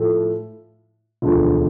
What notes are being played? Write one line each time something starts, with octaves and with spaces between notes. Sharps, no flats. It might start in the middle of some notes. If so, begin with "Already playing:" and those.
Already playing: A2 F3 A3
E1 D2 D3 F3